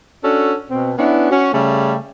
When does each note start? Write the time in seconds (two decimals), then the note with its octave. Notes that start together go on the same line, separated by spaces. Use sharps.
0.22 C#4 D4 F#4 A4
0.70 B2 C4
0.97 B3 C#4 D4 E4
1.30 C#4 F#4
1.53 C#3 G3 A3